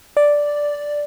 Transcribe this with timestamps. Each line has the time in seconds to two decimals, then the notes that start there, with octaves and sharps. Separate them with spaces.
0.17 D5